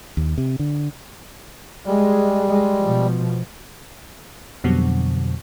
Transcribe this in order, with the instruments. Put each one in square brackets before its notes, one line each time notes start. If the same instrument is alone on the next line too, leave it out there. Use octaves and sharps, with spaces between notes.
[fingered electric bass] D#2
C3
D3
[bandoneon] G3 [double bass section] G#3
[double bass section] G#3
B2 F3
[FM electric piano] F2 B2 D3 F#3 G3